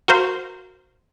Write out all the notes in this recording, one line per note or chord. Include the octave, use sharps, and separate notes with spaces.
F#4 A#4 C5 F5